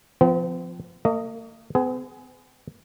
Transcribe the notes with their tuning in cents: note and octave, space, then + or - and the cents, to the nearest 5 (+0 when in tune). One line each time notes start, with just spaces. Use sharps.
F3 +0 C4 -45
A#3 -45 D#5 +0
B3 +45 G#4 +15